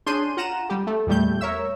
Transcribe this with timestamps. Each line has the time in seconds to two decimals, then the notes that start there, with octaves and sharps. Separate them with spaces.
0.06 C#4 D4 G#4 C6 G6 D#7
0.37 F4 F#5 A#5 D#7 E7
0.69 G3 G4
0.87 A3
1.07 E2 A#2 G3 A3 G6
1.41 A#4 C#5 E5 E6